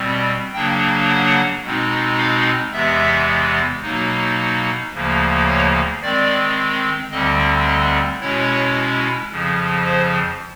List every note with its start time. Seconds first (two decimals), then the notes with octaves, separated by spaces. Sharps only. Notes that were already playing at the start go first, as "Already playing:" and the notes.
Already playing: B2 G3 C4
0.53 C#3 F#3 A#3 D4 G5
1.09 F#5
1.63 B2 G#3 C4 D#4
2.18 F5
2.73 E2 C3 E3 G#3 B3 E5
3.83 B2 F#3 A#3 D#4
4.92 D2 C#3 F3 A#3
5.47 C#5
6.01 D#3 G#3 C4 D5
7.11 D2 D3 G3 C4 D#5
7.67 D#5
8.21 B2 G#3 C#4 E4 C#5
9.31 F2 C#3 F3
9.86 C5